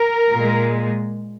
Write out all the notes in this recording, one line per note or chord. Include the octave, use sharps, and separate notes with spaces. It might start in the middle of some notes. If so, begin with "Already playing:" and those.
Already playing: A#4
A#2 G#3